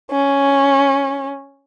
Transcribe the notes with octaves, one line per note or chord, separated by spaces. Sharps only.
C#4